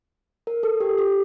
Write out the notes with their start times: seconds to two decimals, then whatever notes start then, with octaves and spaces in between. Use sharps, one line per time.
0.47 A#4
0.63 A4
0.80 G4
0.98 G4